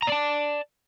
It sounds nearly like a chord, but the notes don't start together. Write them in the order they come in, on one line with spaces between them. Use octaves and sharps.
A#5 D5 A5